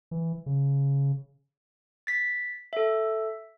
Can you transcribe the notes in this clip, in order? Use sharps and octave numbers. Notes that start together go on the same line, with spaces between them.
E3
C#3
A6 B6
A4 E5